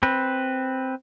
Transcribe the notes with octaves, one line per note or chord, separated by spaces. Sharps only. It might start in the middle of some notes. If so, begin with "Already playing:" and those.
C4 B4